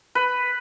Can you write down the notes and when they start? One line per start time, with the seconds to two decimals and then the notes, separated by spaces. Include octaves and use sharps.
0.15 B4